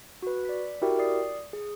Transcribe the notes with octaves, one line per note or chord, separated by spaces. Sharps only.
F#4 B4
D5 B6
E4 F#4 G4 A#4 E5 G5
D5 D#6 C7
G#4